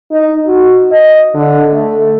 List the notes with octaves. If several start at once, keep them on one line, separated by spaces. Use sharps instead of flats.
D#4
F#4
D#5
D3
A3